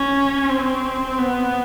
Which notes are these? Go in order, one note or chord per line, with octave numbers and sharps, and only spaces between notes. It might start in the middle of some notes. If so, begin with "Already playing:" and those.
Already playing: C#4
C4
B3